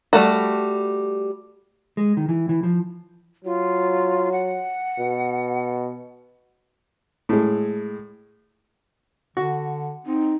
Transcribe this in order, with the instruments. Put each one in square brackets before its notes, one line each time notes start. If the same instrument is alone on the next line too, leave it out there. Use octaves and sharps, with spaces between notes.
[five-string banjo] G3 A3 F#4
[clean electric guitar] G#3
D#3
E3
E3
F3
[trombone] F#3 [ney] F4
[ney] F#5
[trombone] B2
[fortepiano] A2 G#3
[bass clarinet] D3 [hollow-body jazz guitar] F#4
[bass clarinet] C4 [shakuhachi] D#4